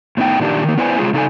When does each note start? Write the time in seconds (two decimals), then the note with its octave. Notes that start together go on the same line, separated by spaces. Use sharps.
0.17 A2 B3 D#4 G5
0.40 A#2 D#3 A#3 D4 G4
0.64 D#3 A#3
0.78 B3 E4 B4 C5 D5 G#5
0.99 C3 G#3 F4 G#4
1.13 C#3 D#4 A4 D5 G#5